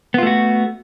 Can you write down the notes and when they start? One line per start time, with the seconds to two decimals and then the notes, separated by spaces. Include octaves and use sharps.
0.14 B3
0.18 F4
0.23 A3
0.27 F#4